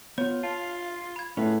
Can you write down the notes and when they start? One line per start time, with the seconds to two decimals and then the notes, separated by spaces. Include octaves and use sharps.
0.18 B3 F4 C#5
0.43 F4 F5 A5
1.16 B5 G#6
1.37 A2 C#4 F4 G#4 B4